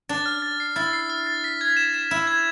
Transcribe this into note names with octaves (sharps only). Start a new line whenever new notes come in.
D4 A6
F6
A6
C7
E4 A6
C7
F6
A6
B6
G#6
E7
E7
E4 E7
G#6